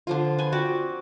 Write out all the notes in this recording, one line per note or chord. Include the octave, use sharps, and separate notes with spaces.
D3 F3 F4
B4 G#5
C4 F#4 D5